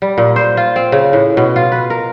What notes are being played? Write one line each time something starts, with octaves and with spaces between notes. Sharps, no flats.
G3
A#2
C5
F4
C4
C#3
A2
B2
F4
B4
A#4